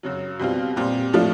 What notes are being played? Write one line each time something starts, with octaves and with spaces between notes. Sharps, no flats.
F#2 C#3 F#3
B2 G3 C4 F4
A#2 G3 C4
A2 F3 A3 D4 F4